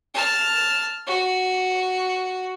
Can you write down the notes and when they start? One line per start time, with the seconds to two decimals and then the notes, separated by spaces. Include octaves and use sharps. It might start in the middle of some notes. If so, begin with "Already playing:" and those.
0.14 A5 F6
1.07 F#4